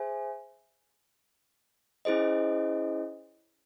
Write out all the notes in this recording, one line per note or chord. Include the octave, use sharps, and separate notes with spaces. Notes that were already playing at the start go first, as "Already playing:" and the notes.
Already playing: G#4 C5 E5 G#5
C#4 E4 G#4 C5 D#5